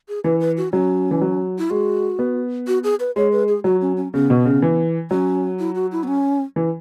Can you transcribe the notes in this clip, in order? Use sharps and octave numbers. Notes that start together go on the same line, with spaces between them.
G#4
E3 B4
B4
F#4
F#3 C#4
E3
F#3
E4
G#3 F#4
B3
F#4
G#4
B4
G#3 C#5
B4
G#4
F#3 F#4
C#4
C#4
C#3 B3
B2
C#3
E3
F#3 C#4
E4
F#4
E4
B3
C#4
E3